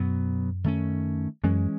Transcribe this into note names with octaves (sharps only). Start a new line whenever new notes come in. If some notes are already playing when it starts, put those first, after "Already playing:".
Already playing: F#2 B2 F#3 B3
D#3 A3 C#4
F#2 E3 G#3 C#4